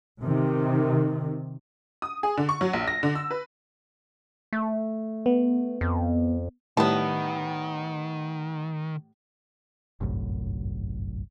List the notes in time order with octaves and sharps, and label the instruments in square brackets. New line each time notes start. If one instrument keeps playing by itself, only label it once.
[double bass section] C3 D#3
[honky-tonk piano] D#6
G#4
D3
C#6
F#3
A#1
A#6
D3
E6
B4
[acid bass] A3
[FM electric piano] B3
[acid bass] F2
[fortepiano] A2 G3 E4 [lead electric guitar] D#3 [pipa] B3 A5
[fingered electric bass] G1 C2 F#2 A2